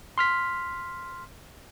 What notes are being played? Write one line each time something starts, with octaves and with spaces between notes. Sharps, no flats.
C6 F6 B6